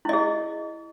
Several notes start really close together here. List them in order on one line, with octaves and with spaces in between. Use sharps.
E4 D#5 G#4